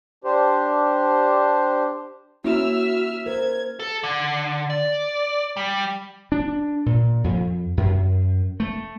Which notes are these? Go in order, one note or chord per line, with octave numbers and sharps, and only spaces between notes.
D4 G4 C5
A#3 C#4 E4 F#4 E5 E6 F6
A#4 C5 G#6
A4
D3
D5
G3
D4
A#2
F2
F#2
A3